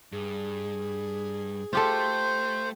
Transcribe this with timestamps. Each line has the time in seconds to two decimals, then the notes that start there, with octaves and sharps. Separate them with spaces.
0.12 G2 G#4
1.73 A3 F4 G4 A4 C5